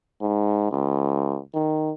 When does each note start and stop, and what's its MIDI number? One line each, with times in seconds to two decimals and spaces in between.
0.22 0.70 44
0.71 1.40 37
1.54 1.92 51